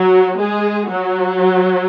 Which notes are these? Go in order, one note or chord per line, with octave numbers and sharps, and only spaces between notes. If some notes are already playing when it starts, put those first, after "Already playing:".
Already playing: F#3 F#4
G#3 G#4
F#3 F#4